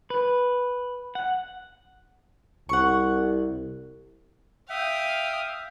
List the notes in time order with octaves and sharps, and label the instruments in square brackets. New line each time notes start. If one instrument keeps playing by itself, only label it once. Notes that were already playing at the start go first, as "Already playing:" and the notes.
[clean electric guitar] B4
F#5
[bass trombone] C2 [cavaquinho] F#5 C#6
[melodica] E5 [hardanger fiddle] F5 D#6 [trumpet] G5